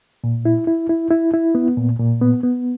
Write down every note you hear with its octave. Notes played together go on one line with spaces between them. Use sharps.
A#2
E4
E4
E4
E4
E4
B3
A#2
A#2
B3
B3